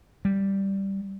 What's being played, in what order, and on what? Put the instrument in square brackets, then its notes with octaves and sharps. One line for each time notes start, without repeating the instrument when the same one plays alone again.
[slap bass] G3